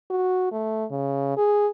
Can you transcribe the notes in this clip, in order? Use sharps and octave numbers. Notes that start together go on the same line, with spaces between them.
F#4
A3
C#3
G#4